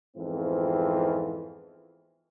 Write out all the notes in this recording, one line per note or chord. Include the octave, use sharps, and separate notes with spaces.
F2 G#2 E3 B3 C4 F4